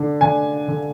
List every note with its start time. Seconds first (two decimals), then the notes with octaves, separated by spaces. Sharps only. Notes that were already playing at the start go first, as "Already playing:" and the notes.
Already playing: D3 D4
0.21 D3 G#5
0.68 D3